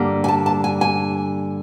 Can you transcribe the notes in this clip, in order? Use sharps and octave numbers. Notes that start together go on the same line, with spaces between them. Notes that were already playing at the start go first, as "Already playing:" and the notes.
Already playing: G2 D3 G3 A#3
G#5
A5
A5
G#5
G#5